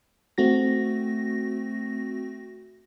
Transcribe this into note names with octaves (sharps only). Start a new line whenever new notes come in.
A3 C4 F#4 A#6